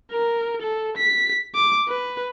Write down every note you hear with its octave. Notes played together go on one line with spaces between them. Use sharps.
A#4
A4
B6
D6
B4